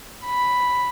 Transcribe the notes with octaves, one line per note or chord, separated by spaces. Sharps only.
B5